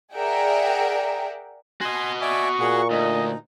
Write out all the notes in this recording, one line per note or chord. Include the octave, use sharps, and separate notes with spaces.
G#4 A#4 D5 E5 F#5 G5
F#4 D#5 G#5 C6
D5 E5 G#5 C#6
A#2 G#4 F#5
D2 D#4 D#5